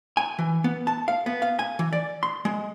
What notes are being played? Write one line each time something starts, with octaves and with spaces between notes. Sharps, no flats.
G#5
E3
B3
A5
F5
B3
F5
G#5
E3
D5
C6
G#3